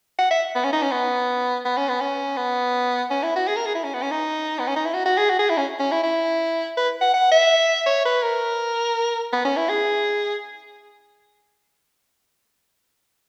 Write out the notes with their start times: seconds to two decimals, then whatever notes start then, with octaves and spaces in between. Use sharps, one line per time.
0.19 F#5
0.31 E5
0.55 B3
0.64 C#4
0.73 D#4
0.82 C#4
0.92 B3
1.65 B3
1.77 C#4
1.89 B3
2.01 C#4
2.37 B3
3.11 C#4
3.23 E4
3.36 F#4
3.47 G#4
3.56 A#4
3.66 G#4
3.75 E4
3.84 C#4
3.94 B3
4.02 C#4
4.11 D#4
4.59 B3
4.67 C#4
4.76 D#4
4.85 E4
4.94 F#4
5.06 F#4
5.18 G#4
5.30 F#4
5.39 G#4
5.49 E4
5.58 C#4
5.79 C#4
5.92 E4
6.03 E4
6.77 B4
7.01 F#5
7.14 F#5
7.31 E5
7.86 C#5
8.05 B4
8.23 A#4
9.33 B3
9.45 C#4
9.57 E4
9.69 G#4